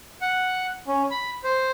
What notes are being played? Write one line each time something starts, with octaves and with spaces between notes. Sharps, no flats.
F#5
C#4
B5
C5